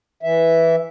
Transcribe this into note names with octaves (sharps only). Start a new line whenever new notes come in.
E3 E5